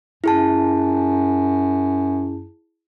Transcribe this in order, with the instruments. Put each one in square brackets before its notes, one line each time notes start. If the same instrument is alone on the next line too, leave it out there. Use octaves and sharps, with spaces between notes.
[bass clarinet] F#2 [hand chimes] E4 G#4 A5